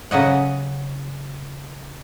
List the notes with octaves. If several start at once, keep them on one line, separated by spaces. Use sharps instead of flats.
C#3 F#3 D#5 F#5